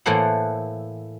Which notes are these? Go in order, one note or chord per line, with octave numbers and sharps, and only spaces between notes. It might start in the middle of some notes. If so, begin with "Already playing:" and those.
A2 E3 A#3 A4 C5 F#5